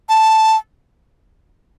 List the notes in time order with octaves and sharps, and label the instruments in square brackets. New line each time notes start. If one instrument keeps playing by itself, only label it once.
[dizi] A5